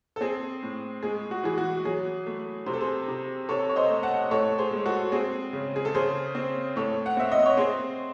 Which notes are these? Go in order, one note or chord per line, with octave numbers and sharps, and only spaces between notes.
A4
C4 G#4
A2
G#3 G#4
F#4
E3 G#4
F#4
F#3 G#4
A3
C3 C5
A4
G#4 C5
C3
C3 A4 C#5
C#5
C5 D#5
A3
F#5 A5
A2 A4 C#5
G#4 C5
G#3
F#4 A4
C4 G#4
C#3
G#4
A4
C#3 G#4 C5
C4
A2 A4 C#5
F#5
C4 E5
D#5
C#5
C4 G#4 C5